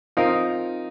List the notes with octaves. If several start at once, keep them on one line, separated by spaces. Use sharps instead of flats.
F3 C4 D#4 F4 A#4